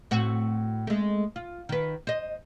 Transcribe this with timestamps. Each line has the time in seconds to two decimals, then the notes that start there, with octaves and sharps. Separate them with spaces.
0.11 A2 C4 F#4
0.87 G#3 A3
1.36 F4
1.69 D#3 B4
2.07 C5 D#5